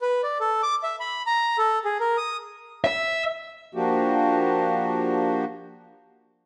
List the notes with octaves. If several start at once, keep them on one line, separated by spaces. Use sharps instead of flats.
B4
D5
A4
D6
E5
B5
A#5
A4
G#4
A#4
D#6
E5
F3 A#3 D4 F#4 G4